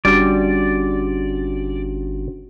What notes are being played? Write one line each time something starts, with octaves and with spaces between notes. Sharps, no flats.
G1 G3 C#4 D4 F#4 D5